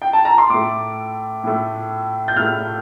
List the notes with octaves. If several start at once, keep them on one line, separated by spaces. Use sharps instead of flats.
G5
A5
A#5
C6
A2 A3 D6
A2 A3
G6
A2 A3 F6